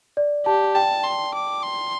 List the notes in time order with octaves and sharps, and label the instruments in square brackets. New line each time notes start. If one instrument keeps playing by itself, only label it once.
[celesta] D5
[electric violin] G4 [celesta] A5
[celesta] G5 [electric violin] A5
[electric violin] C6
D6
C6